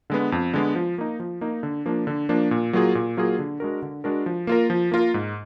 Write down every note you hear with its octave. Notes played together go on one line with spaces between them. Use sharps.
D3 G#3 B3
F2
D3 G#3 B3
F3
A#3 D#4
F3
A#3 D#4
D3
F3 A#3 D4
D3
F3 A#3 D4
A#2
F#3 A#3 F4 G#4
A#2
F#3 A#3 F4 G#4
D3
G#3 D4 F#4 A#4
D3
G#3 D4 F#4 A#4
F3
A#3 F4 A#4
F3
A#3 F4 A#4
G#2